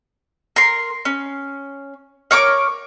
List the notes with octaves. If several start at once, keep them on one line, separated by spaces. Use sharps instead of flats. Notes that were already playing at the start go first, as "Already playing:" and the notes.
A#4 C6
C#4
A#4 C#5 C#6 D6